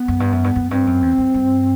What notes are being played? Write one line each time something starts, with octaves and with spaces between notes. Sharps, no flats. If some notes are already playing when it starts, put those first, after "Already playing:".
Already playing: B3
F#2
G2
F#2
G2
F#2
G2 C4
F#2
E2
F#2
G2